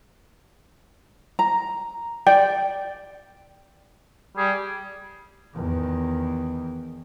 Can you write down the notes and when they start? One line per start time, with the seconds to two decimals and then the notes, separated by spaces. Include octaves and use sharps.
1.39 A#5
2.27 D5 G5
4.37 G3 G#4
5.55 E2 D#3